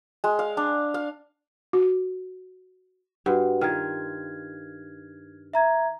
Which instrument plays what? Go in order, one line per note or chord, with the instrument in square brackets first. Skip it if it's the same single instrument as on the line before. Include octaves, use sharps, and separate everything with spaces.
[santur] G#3
F5
D4
F5
[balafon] F#4
[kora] G2 [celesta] F#4 B4 F#5
[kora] D#3 F4 [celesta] F6 G#6
[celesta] E5 A#5 G#6